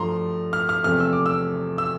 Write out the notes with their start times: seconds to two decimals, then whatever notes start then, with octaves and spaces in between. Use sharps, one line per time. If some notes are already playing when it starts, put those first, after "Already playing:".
Already playing: G2 F3 A3 A#5 C6
0.53 F6
0.69 F6
0.84 E2 C3 F3 A3 C4 F6
1.00 E6
1.13 D6
1.26 E6
1.78 E6